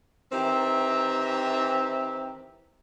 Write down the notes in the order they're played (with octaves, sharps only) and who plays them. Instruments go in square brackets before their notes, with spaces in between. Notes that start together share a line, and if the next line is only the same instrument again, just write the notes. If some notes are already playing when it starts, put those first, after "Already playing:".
[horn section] D#3 E3 C4 G4 E5 A#5